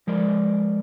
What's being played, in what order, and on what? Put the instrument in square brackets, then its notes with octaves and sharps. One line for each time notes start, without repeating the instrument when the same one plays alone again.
[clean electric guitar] F3 G#3 A#4 D5